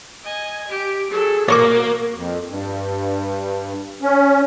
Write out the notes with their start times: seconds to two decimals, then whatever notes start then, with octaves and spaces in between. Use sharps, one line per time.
0.23 D#5 G#5
0.68 G4
1.11 F#3 G#4 A4
1.49 A#3 F#4 A#4 C#5 C#6 D6
2.14 F2
2.49 G2
4.02 C#4